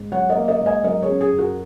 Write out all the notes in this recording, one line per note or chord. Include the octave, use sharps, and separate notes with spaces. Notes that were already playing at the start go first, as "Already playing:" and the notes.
Already playing: G#2
F#3 C#5 F#5
A#4 D#5
A#3
A#4 D#5
G#2
D#5 G#5
F#3 A#4 D#5
G#4 C#5
C#4
G#4
F#2
F#4 A#4